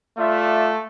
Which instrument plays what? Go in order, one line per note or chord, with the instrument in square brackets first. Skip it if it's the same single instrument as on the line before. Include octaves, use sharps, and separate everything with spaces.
[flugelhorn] A3 [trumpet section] F4 D5 E5